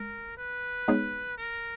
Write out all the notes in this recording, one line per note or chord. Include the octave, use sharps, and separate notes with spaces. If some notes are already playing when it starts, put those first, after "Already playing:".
Already playing: G#3 A#4
B4
G#3 B3 D#4 G#4 C#5
A#4